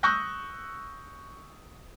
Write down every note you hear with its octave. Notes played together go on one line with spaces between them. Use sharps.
C#6 D#6 E6 F#6 G6 A#6